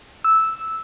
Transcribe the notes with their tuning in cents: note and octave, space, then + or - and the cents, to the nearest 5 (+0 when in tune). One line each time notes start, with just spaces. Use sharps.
E6 -5